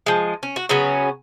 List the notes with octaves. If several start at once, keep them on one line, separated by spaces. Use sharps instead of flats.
F3 G#3
C#4
F#4
C#3 F#3 B3 C#4